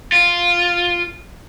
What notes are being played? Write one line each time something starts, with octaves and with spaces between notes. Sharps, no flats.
F4